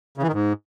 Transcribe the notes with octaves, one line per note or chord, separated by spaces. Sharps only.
C#3
E3
D#3
G#2